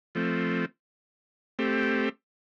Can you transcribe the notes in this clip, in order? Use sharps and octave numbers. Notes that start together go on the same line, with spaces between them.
F3 A3 C4
A3 C4 G4